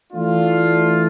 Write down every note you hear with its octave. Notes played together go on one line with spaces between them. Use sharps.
E3 A3 D4 F4